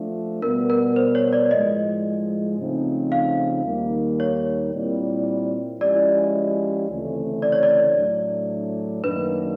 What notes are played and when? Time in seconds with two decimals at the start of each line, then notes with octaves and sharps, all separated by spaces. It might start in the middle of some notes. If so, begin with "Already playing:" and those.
Already playing: F3 A3 D4
0.42 B2 G3 B3 A#4
0.70 A#4
0.96 C5
1.15 C#5
1.33 D5
1.51 A2 F3 G#3 D#5
2.58 C#3 F3 A3 C4 D#4
3.12 F5
3.65 D#2 D#3 G3 A#3
4.20 C#5
4.73 A#2 G3 C4 E4
5.80 F3 G#3 C#4 E4 G4 D5
6.88 D2 C#3 E3 A3 C4
7.42 D5
7.52 C#5
7.63 D5
7.96 A2 F#3 A3 D4
9.03 F#2 D#3 F#3 A#3 D4 B4